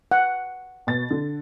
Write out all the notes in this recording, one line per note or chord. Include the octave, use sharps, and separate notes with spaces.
F#5
B2 A6
D3